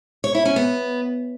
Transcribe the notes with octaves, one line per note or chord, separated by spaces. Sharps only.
C#5
E4
C#4
B3